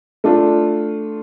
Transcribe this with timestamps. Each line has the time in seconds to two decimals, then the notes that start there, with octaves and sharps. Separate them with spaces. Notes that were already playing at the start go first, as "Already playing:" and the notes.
0.24 A3 D4 F4